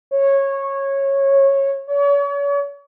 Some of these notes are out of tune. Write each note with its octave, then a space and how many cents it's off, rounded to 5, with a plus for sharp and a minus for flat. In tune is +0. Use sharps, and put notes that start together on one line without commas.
C#5 -15
C#5 +40